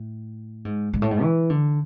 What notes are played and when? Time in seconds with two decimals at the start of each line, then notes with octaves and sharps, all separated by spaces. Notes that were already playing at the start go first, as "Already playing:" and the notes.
Already playing: A2
0.65 G#2
0.93 G#2
1.02 A2
1.11 G#2
1.22 E3
1.50 D3